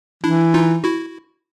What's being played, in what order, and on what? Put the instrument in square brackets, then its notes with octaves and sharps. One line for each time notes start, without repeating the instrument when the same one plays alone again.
[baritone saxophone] E3 [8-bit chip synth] D4 E4
[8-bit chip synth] D#4 F4
E4 F#4